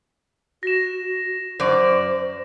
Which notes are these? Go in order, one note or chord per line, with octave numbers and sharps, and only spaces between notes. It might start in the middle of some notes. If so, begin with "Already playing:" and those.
F#4 A#6 E7
F#2 C5 D5